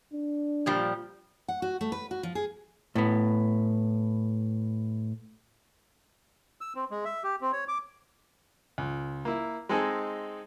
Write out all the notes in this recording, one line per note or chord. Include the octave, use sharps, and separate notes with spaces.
D4
A#2 F3 G3
F#5
F#4
A3
B4
F#4
F3
G#4
A2 B3
E6
C4
G#3
E5
G4
C4
C#5
D6
C#2
A#3 E4
G#3 C4 D#4 A4 G#5